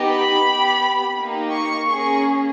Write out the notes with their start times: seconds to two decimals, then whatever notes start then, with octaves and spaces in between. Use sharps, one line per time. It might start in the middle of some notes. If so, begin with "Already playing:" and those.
Already playing: B3 D#4 G4
0.08 B5
0.45 B3 G4
1.17 A#3 D#4 G4
1.54 C#6
1.90 A#3 C#4 G#4 C#6